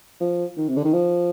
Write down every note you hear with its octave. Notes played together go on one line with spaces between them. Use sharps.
F3
D#3
C3
D3
D#3
F3